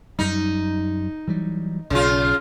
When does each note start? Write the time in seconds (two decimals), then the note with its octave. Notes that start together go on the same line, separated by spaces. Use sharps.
0.19 F#2 G3 D#4
1.28 E3 F#3 G3
1.90 B1 C#3 F4